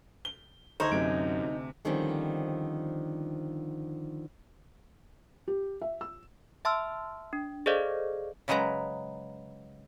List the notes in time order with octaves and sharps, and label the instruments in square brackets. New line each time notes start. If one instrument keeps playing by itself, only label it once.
[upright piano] G7
[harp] D2 G#4 G#6 [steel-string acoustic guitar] D#4 [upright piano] C5 A#5 C#6
[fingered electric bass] F#2 [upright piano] C3 D7
[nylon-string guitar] D3 D#3 F3 G3 C4 C#4
[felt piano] G4
E5
E6
[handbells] E5 A5 C6 E6 F6
D4
G#4 A4 C5 D5 D#5 F5
[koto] C#3 F#3 G#3 B4 A#5